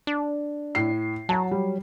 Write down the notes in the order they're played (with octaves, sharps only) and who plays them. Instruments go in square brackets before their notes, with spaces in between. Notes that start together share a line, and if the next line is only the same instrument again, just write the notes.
[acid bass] D4
[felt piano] A2 C7
[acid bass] F#3 [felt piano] A5 A#5
[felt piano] G3